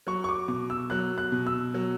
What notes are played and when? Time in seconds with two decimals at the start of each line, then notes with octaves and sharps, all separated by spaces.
0.07 F#3 C#6
0.24 C#6
0.29 D6
0.48 B2 D6
0.70 E6
0.90 F#3 F#6
1.18 F#6
1.32 B2
1.47 E6
1.74 F#3